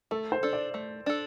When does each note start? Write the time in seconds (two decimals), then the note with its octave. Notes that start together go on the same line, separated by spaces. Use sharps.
0.11 A3 A4
0.32 C5
0.43 D4 A4
0.53 D5
0.74 A3
1.06 D4 A4